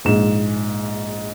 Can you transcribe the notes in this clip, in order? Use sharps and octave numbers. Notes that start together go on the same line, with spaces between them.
A#1 G#2 E7